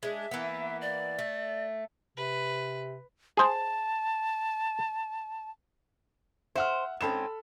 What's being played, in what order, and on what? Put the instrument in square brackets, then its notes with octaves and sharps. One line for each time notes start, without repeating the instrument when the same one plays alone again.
[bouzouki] G#3 D4 [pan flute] E5
[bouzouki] E3 A#3 B3
[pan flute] D5
[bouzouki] A3
[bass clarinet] C3 [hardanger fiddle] B4
[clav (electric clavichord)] G#4 C5 [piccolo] A5
[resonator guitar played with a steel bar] C5 [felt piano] E5 F#5 F6
[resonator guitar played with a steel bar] G#2 C4 C#4 [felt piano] A4 B5 E7